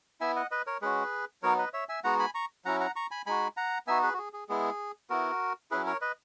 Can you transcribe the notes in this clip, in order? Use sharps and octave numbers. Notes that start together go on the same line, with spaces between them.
B3 E4 E5 G#5
D#5 F#5
B4 D#5
A#4 C#5
G#3 C#4 F#4 G#4 B4
F#3 B3 D#4 A#4 C#5
B4 D#5
C#5 E5
E5 G#5
G#3 B3 D#4 F#4 F#5 A#5
G#5 B5
A#5 C#6
F#3 C#4 E4 F#5 A#5
F#5 A#5
A#5 C#6
G#5 B5
G#3 D#4 F#4 G#5 B5
F#5 A#5
B3 D#4 F#4 E5 G#5
G#4 B4
F#4
G#4
G#4
G#3 B3 E4 G#4
B3 E4 F#4 A#4
F#3 C#4 E4 G#4 B4
A#4 C#5
B4 D#5